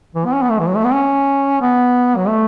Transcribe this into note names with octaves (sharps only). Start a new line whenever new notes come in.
E3
B3
C#4
B3
A3
E3
F#3
A3
B3
C#4
B3
F#3
A3